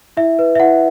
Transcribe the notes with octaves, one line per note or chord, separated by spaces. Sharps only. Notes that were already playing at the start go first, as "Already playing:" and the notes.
E4 E5
B4
E5
E4 F#5